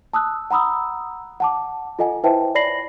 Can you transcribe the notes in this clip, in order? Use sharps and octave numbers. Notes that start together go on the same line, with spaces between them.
A5 D#6 E6 F#6
F#5 A#5 B5 D#6 E6
F#5 A5 D6
F4 A4 D#5 F#5 G#5
E4 B4 C5 E5 G5 A5
C#5 D5 B5 A#6 C7 F#7